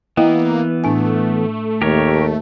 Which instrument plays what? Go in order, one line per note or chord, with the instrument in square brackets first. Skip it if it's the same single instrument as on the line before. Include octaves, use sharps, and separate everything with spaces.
[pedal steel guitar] E3 B3 [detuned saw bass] A#3 [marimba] E4 D#5 G5
[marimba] A2 D4 G#5 [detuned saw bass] A3
[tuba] D#2 [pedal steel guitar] G4 A#4 C#5